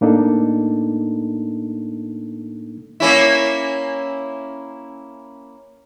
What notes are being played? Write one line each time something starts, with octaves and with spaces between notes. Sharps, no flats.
A2 A#3 D4 D#4 A4
A#3 C#4 E4